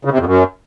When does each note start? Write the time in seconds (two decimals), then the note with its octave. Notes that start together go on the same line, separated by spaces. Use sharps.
0.05 C#3
0.12 C3
0.19 F2
0.26 F#2